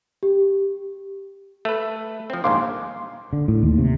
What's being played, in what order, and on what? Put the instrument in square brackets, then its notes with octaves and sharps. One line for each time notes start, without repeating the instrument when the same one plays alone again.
[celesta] G4
[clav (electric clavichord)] A3 B4
F3 C4
[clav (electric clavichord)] A#1 D#2 G#2 [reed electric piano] F5 C6 D6
[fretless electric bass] D3
A2
D#2
C3